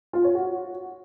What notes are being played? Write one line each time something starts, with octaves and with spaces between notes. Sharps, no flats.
F4
C#5
F#4